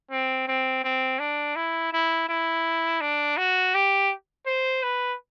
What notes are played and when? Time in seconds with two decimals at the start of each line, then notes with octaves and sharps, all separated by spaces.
0.11 C4
0.48 C4
0.84 C4
1.19 D4
1.56 E4
1.93 E4
2.29 E4
3.01 D4
3.37 F#4
3.74 G4
4.46 C5
4.83 B4